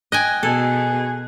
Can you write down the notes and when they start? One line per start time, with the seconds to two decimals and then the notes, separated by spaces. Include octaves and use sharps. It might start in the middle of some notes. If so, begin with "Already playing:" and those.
0.12 D#5 G5 G#5 F#6
0.43 B2 G#4 A4